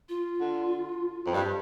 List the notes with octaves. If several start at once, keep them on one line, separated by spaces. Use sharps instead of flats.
F4
D3
F2
G2 G4